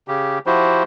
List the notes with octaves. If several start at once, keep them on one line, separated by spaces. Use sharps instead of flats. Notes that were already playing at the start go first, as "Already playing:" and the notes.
C#3 G4
F3 E4 F#4 G4 C5